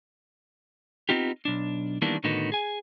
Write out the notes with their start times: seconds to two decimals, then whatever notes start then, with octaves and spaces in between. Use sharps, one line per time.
1.09 B3 C4 D#4 F4 G4
1.45 B1 D4
2.02 D#3 E3 G3 A#3 B3 D4
2.24 A2 D3 D#3 B3 D#4 F#4
2.52 G#4 G#5